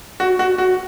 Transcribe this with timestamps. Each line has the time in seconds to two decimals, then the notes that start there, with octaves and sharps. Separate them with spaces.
0.20 F#4
0.39 F#4
0.58 F#4